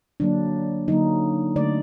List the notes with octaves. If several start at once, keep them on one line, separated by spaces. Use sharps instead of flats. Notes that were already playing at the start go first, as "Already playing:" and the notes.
D3 F#3 A#3 D4
D3 F#3 A#3 D#4
D3 A3 D5